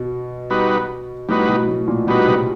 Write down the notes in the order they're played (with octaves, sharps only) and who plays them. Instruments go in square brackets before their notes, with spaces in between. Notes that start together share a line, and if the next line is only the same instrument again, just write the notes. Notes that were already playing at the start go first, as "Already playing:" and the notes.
Already playing: [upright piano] B2
[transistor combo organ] G3 B3 D#4 F#4 B4
[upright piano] A2 [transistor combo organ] G3 B3 D#4 F#4 B4
[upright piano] B2
A2
A#2
[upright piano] B2 [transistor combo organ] G3 B3 D#4 F#4 B4
[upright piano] C3